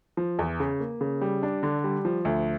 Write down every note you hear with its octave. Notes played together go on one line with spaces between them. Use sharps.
F3
E2
C#3
A#3
C#3
G3
D4
D3
G3
F3
D2